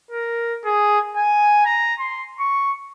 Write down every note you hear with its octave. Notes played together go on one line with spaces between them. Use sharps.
A#4
G#4
G#5
A#5
C6
C#6